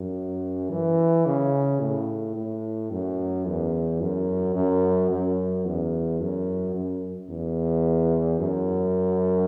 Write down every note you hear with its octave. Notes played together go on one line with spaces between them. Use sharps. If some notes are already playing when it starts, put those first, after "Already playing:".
Already playing: F#2
E3
C#3
A2
A2
F#2
E2
F#2
F#2
F#2
E2
F#2
F#2
E2
F#2